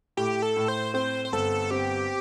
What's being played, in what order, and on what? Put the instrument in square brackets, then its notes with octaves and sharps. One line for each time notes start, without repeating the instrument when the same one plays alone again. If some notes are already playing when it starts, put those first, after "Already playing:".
[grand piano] A2 [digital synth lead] G4
[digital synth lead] A4
[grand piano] A2
[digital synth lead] C5
[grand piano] C4 [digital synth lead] C5
[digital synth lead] C5
[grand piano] G1 [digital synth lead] A4
[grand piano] C4 [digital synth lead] G4